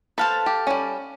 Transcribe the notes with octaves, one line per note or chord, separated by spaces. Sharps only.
A4 B4 C5 F5 A5
G4
G3 C#4